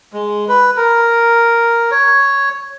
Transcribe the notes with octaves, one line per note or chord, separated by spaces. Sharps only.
G#3
B4
A#4
C#5